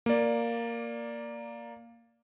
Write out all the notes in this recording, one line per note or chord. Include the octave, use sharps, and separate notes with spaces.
A#3 D5